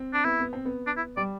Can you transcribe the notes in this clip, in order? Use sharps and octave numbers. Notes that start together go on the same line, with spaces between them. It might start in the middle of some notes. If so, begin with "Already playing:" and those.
Already playing: C4
D4
B3 E4
B3
C4
B3
D4
E4
G3 D5